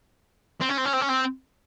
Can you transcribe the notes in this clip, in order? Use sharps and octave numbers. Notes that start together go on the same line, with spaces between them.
C4
C#4
C4
C#4
C4
C#4
C4